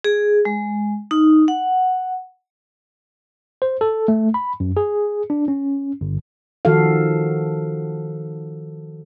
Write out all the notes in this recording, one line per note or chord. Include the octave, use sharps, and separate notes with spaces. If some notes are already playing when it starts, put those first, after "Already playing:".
G#4
G#3
D#4
F#5
C5
A4
A3
B5
F#2
G#4
D4
C#4
G1
D#3 F3 F#4 A4 F5